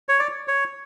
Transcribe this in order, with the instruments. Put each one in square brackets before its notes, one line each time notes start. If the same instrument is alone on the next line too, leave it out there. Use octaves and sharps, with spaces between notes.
[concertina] C#5
D5
C#5